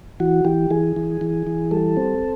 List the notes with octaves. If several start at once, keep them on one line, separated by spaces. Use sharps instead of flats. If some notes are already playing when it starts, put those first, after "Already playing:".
E3 F#4
E3 G4
E3 G#4
E3
E3
E3
G3 A4
C4